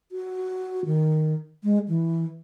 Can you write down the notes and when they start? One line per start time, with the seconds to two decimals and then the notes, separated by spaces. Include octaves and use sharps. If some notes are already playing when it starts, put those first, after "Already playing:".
0.12 F#4
0.86 D#3
1.64 G#3
1.88 E3